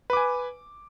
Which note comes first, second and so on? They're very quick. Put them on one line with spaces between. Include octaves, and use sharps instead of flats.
B4 D6 G#5